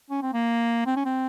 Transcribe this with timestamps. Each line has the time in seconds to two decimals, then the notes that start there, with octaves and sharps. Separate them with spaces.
0.10 C#4
0.22 C4
0.33 A#3
0.86 C4
0.96 C#4
1.06 C4